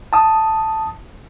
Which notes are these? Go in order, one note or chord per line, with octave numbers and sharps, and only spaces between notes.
A5 D#6